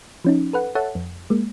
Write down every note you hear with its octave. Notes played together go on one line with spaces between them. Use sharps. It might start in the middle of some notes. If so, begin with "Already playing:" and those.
F3 C#4 D#4
A4 B4 F#5
A4 C#5 E5 F#5 A5
F2
G#3 A#3